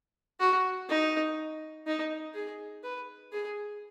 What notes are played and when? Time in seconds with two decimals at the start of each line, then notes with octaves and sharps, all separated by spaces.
0.40 F#4
0.89 D#4
1.87 D#4
2.34 G#4
2.83 B4
3.32 G#4